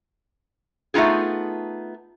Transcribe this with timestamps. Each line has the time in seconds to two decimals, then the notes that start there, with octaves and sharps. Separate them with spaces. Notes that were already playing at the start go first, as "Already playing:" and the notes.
0.94 A3 B3 D#4 F4 G#4